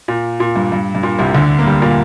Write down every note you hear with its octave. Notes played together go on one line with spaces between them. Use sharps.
A#2
A#2
G2
G2
G2
A#2
C2 C3
D2 D3
A#3
G2 G3
A#2 A#3